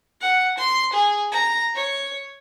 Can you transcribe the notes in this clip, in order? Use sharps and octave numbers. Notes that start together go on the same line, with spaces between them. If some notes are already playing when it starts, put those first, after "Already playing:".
F#5
C6
G#4
A#5
C#5